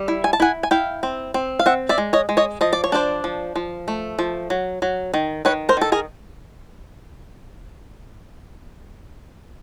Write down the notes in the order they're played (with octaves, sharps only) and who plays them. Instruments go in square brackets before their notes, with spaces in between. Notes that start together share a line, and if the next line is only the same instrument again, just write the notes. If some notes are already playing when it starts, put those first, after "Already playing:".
Already playing: [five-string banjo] G3
E4
G#5
A5
E4 F#5 G#5
G#5
E4 F5 G5
C4
C4
F5
C4 E5 F#5
D5 E5
G#3
C#5 D#5
G#3
C#5 D#5
F3 D#5
D5
C#5
D4 C5 D5
F3
F3
A3
F3
F#3
F#3
D#3
D#3 B4 C#5
A#4 C5
D#3 A4
G#4 A#4